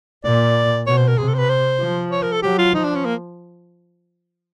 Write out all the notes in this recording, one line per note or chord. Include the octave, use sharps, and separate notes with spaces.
A#2 D5
B2 C#5
C5
A#4
C3 G#4
A4
C5
B4
C5
F3
C#5
A#4
A4
F#3 G4
F4
F3 D#4
D4
C#4
A#3